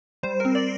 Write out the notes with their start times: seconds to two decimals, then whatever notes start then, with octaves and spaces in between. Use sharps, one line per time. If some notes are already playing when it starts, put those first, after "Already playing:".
0.23 G3 C5
0.40 C4 A#4
0.55 D5